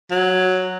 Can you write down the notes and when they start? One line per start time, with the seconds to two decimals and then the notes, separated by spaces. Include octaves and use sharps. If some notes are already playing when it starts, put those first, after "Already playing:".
0.11 F#3